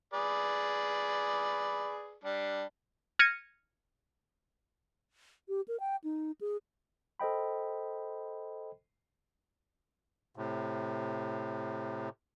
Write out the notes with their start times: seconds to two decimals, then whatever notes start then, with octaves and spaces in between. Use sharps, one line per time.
0.14 G#4 B4 D5
2.24 G3 D4
3.19 F6 G#6 A#6 C#7 D#7
5.48 G4
5.68 A#4
5.80 G5
6.04 D#4
6.41 G#4
7.20 A4 C5 D#5 G5 B5
10.36 A2 C3